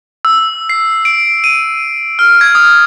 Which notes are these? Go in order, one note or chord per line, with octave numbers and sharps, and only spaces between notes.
E6
C7
D7
D#7
F6
G#6
D#6